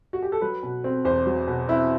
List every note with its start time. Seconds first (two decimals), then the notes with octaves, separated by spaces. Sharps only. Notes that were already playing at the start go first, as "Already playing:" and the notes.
0.13 F#4
0.22 G4
0.32 A4
0.41 F#3 B4
0.63 B2
0.84 C4
1.05 E2 C5
1.26 F#3
1.48 B2
1.69 C4 E4